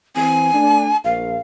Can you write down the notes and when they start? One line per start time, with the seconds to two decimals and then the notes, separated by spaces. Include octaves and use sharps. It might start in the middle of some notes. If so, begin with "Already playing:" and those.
0.16 E3 C4 G#5
0.53 A3 D4
1.05 A#1 F5